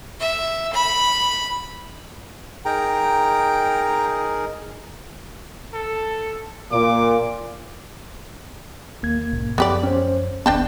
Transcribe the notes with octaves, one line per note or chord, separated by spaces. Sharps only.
E5
B5
D#4 G#4 A#4 G5 A#5
A4
A#2 D6
D#2 A#3 G#6
B1 G#2 C#3
F#2 F3 B3 G4 D5
C#4 C5
F1 A#1 D#2 B3 D4 G5 A5